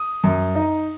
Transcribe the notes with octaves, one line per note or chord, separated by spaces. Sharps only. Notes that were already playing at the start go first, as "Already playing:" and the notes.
Already playing: D#6
F#2
D#4